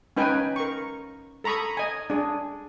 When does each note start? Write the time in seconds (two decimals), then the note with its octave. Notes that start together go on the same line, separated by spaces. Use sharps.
0.17 C#4 D#4 B4 G5 G#5
0.56 A#4 C#6
1.44 A4 A#5 B5 C#6 D#6
1.77 D#5 G#5
2.10 D4 G#4